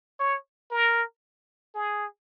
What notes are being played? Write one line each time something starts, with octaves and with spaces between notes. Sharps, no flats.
C#5
A#4
G#4